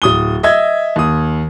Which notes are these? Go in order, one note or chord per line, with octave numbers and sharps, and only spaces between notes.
D1 D#6 G7
D#5 E5 G#6
D#2 D#6